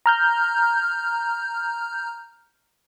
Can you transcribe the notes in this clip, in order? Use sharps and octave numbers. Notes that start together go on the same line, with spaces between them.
A#5 F6 G6